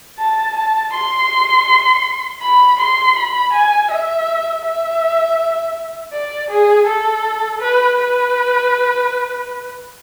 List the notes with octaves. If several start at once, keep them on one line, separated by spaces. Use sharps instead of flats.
A5
A5
C6
B5
C6
B5
G#5
E5
E5
D5
G#4
A4
B4
B4